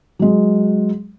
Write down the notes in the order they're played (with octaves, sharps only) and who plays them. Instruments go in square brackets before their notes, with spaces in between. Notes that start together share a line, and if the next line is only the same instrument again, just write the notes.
[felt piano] F#3 G#3